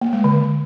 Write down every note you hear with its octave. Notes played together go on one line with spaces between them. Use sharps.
A#3
G#3
D3